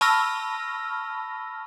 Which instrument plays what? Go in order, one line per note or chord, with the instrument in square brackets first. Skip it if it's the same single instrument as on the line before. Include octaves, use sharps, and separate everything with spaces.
[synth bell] A5 B5 C#6 E6 F6 A#6